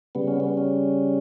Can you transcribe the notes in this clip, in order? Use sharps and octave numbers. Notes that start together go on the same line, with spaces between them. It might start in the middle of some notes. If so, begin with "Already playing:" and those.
C#3 G3 B3
C#4
B3
C#4